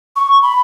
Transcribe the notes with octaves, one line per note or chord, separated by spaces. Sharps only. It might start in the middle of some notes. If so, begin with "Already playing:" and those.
C#6
B5